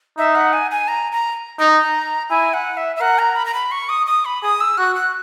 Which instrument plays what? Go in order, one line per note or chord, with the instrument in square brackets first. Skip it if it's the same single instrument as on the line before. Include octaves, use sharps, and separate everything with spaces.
[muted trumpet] D#4 [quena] E5
[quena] F#5
G#5
G#5
A#5
A#5
[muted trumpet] D#4 [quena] A#5
[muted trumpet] E4 [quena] G#5
[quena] F#5
E5
E5
[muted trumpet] A#4 [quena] F#5
[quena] A#5
B5
A#5
B5
C#6
D#6
D#6
B5
[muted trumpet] G#4 [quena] D#6
[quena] E6
[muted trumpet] F#4 [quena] F#6
[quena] F#6